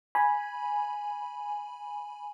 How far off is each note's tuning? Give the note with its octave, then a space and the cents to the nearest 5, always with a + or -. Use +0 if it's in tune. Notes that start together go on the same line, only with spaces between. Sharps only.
G#5 +0 B5 -15